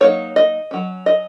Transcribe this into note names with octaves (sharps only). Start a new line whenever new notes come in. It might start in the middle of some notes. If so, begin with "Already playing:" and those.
F#3 A#3 D#4 C#5
D#5
F#3 C#4
D#5